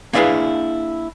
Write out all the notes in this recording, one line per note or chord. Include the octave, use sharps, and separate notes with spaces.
A#3 D4 E4 G#4 B4 F5